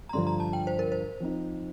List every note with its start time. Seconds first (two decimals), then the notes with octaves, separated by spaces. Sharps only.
0.09 A#5
0.13 G2 D3 F3 C6
0.27 A#5
0.40 A5
0.53 G5
0.67 C5
0.79 A#4
0.92 C5
1.20 F3 C4 D#4